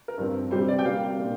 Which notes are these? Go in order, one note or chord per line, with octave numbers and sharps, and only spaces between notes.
A#4
G2 F3 C4
C3 G3 C4 C5
D5
G5
C3 G3 A#3 F5
A#2 A#3 D4